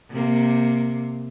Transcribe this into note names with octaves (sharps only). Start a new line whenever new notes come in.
C3 A#3